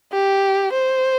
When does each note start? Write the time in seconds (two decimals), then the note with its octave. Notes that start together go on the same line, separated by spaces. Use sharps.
0.13 G4
0.73 C5